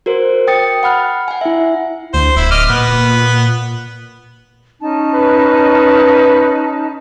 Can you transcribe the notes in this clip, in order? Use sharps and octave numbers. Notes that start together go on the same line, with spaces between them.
F#4 A#4 C5
G5 D#6 A6 C#7
F#5 B5 F6 F#6
F#5 G#5
E4 E5
D2 C5
D1 E4
D#5 D6 F6
A#2 B3
C#4 D#4 A5
B4